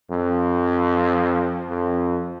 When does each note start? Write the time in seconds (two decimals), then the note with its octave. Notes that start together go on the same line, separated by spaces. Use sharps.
0.11 F2
1.70 F2